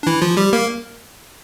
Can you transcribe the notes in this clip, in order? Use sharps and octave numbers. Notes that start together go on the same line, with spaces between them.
D4
E3 E4
F3 F4
G3 G4
A#3 A#4